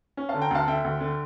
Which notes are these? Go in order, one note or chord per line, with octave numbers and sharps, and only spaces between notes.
C#4
F5 A5
D3
G5 A#5
D2 F5 A5
D3 E5 G5
D2
D3